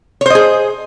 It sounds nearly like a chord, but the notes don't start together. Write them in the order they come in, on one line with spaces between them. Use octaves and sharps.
C#5 C5 D#5 G#4